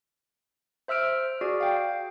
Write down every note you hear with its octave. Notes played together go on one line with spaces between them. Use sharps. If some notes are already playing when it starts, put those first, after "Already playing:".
C5 E5 E6 F6 D7
F#4 G#4 D5
F5 G5